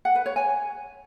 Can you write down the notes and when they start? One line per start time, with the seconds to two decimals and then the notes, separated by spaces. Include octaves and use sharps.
0.05 F#5
0.15 B4
0.26 C#5
0.36 G#5